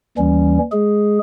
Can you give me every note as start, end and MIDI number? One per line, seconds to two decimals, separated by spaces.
0.18 0.58 39
0.18 0.58 52
0.18 0.58 55
0.18 0.58 61
0.72 1.19 56
0.72 1.19 68